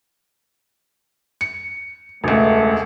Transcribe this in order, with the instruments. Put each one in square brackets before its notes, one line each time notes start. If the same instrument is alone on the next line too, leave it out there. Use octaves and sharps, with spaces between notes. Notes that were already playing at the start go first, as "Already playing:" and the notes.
[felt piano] C#7
[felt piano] E1 C#2 [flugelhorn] A3